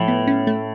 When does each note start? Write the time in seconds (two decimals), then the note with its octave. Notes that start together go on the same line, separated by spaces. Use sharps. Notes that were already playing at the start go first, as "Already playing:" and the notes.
Already playing: A2 F3
0.08 B3
0.27 C#4
0.47 A3